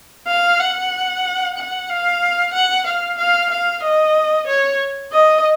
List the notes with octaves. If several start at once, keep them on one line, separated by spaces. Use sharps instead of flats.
F5
F#5
F#5
F5
F#5
F5
F5
F5
D#5
C#5
D#5